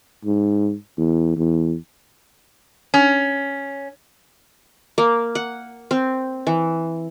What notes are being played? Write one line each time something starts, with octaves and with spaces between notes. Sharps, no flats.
G#2
E2
E2
C#4
A#3
F#5
C4
E3